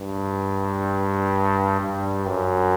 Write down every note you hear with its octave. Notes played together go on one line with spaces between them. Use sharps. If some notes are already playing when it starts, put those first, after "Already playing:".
Already playing: G2
G2
F#2